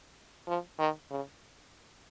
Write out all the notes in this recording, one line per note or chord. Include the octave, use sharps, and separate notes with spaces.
F3
D#3
C#3